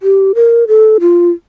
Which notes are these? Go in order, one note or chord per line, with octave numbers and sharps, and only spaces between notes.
G4
A#4
A4
F4